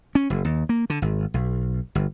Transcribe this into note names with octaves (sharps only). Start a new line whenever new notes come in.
C#4
F#1
D#2
A#3
D3
G#1
B1
G1